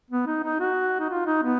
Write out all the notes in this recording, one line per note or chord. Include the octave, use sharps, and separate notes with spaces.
B3
D#4
D#4
F#4
D#4
F4
D#4
B3